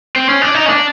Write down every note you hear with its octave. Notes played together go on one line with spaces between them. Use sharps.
C4
C#4
D4
D#4
C#4
D4